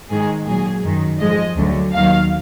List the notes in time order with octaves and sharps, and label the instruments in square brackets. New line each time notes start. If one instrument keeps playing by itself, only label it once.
[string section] G#2 D#3 G#3 G#4
A#2 F#3 G#4
F#2 D#3 F#3
G#2 F3 G#3 D#5
D2 D3 F#3
D#2 D#3 F#3 F5